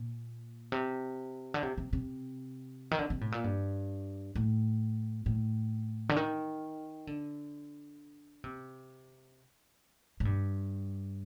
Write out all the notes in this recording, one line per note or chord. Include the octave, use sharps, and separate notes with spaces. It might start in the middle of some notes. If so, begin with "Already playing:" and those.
Already playing: A#2
C3
D3
C3
C3
C3
D#3
D3
C3
A2
A#2
G2
A2
A2
D3
D#3
D3
C3
A2
G2